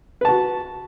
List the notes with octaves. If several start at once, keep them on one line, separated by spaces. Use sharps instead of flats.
F#4 B4 A5